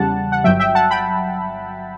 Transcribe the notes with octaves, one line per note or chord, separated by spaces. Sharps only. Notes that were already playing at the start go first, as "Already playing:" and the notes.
Already playing: E2 C#3 G3 F#5 A5
F#5
G1 G2 F#3 E5 G5
E5 G5
F#5 A5
G5 B5